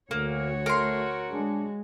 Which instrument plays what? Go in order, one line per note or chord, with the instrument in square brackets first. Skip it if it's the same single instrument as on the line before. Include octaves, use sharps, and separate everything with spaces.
[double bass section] D2 [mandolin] A#3 [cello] F#4 C#5
[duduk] A3 [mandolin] A#4 C6
[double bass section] G#3 [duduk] D4